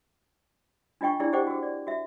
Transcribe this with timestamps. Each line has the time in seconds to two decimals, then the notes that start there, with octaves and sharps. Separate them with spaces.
1.01 D4 F4 D#5 G5 C#6
1.20 D4 E4 G#4 D5
1.33 G4 C5 D#5 F#5 G5 D6
1.47 F#4 G#4
1.63 D5
1.87 F#4 E5